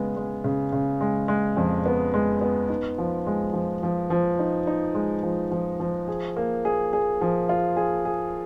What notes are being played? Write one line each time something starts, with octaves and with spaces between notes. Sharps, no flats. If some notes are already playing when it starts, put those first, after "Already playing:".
Already playing: C#3 G#3 B3
G#3
C#3
C#3
G#3
G#3
F2
B3
G#3
B3
D#4
F3
G#3
F3
F3
F3
D#4
D#4
G#3
F3
F3
F3
G#4
A#3
G#4
G#4
F3
F4
G#4
G#4